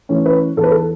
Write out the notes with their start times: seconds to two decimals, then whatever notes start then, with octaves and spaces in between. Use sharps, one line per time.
0.09 E3 A3 C#4
0.26 B4
0.57 E2 A4
0.64 B4
0.71 A4